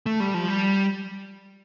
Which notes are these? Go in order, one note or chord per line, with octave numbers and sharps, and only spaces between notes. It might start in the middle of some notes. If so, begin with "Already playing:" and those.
A3
G3
F3
G3